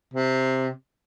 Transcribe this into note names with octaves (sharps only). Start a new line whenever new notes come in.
C3